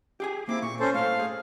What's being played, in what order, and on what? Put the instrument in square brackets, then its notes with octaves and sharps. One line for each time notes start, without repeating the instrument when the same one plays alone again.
[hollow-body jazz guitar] G4 G#4 G#5
[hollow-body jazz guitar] A#3 [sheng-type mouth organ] C4 E4 D6
[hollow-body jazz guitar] A#2 [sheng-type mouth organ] C#6
[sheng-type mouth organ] C#4 A4 C5
[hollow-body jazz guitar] A2 C5 [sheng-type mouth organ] F5
[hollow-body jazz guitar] G#4